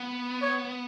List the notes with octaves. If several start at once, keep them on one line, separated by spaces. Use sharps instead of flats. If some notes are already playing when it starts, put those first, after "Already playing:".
Already playing: B3
C#5